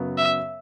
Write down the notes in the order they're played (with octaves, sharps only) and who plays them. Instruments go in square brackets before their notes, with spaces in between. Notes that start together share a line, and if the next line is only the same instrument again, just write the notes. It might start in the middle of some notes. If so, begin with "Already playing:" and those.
Already playing: [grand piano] F#2 C#3 F#3 B3
[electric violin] E5